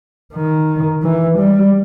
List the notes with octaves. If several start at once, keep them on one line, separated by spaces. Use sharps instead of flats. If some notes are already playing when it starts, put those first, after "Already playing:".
D#3
E3
G3